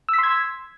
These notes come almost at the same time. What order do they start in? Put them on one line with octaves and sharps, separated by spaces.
E6 B6 C6 G#6